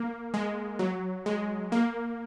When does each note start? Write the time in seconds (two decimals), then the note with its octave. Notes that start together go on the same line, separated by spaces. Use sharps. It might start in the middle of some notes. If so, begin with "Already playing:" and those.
Already playing: A#3
0.34 G#3
0.79 F#3
1.26 G#3
1.72 A#3